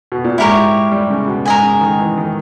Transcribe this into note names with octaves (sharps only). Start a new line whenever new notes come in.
B2
A#2
G#2 E4 G4 A#4 C#5
G3
C#3
B2
G#2 A#4 D#5 G#5
C#3
D#3
E3
D#3